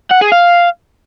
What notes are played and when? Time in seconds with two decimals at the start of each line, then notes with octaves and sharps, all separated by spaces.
0.11 F#5
0.21 G#4
0.32 F5